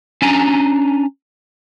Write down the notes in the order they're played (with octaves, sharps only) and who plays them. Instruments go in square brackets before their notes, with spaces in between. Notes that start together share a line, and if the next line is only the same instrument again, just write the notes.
[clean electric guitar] C#4 D4 G#5 A#5